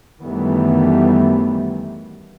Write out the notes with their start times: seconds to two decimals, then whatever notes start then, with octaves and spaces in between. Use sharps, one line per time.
0.21 F#2 D#3 E3 G3 A3 B3